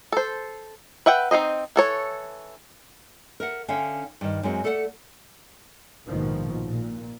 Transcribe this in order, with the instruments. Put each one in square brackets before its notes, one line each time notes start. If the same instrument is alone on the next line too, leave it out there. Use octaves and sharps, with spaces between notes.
[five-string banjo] A4 C5
B4 E5 F#5 G5
C4 D#4 C5 D#5
E3 A4 C#5
[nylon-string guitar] A#4 E5 F#5
D3 C#4 E5 F5 G5
G2 D#3
F#2 G#3 C4 F#4
A3 A4 D5 F5 F#5
[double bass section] A#1 G#2 B2 D#3 F3
A#2